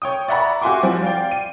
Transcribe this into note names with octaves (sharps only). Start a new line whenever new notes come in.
C#5 G5 D#6
D5 E5 F#5 A#5 B5 C#6
F#4 G4 E5 G#5 C6 D6
F3 G3 C4 E4 F#4
D5 F5 G5
D#7